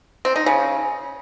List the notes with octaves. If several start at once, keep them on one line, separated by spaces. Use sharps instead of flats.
C4
D#4
C#3